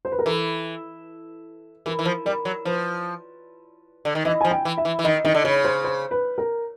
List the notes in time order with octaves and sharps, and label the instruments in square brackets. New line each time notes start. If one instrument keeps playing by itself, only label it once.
[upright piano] C5
B4
A#4
[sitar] E3 [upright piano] A4
[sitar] E3 [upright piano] A#4
[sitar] E3
F3
[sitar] G3 [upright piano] A#4
[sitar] F#3
[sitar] F3 [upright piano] B4
[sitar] D3
D#3
[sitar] E3 [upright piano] D#5
[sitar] F3 [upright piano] G#5
[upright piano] G5
[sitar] E3
[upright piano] E5
[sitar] E3
E3
[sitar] D#3 [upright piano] D#5
[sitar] D#3 [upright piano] D#5
[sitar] D3
[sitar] C#3 [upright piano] C#5
[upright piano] C5
C5
B4
A#4